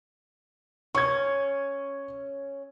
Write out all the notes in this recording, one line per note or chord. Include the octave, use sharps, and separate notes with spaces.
C#4 C#6 G#6